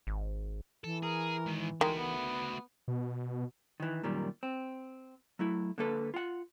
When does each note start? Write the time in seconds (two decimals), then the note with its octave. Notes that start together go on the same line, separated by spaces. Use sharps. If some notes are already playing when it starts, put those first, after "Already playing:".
0.07 G#1
0.84 E3 A4
1.03 G#4 A#4
1.47 G#2 D#3
1.81 D#3 G#3 A3 F#4
1.97 B3
2.88 B2
3.80 D#3 E3
4.03 F#2 A#2 D#3 G3
4.43 C4
5.39 F#3 A3 E4
5.78 D3 A#3 A4 B4
6.14 F4 F#5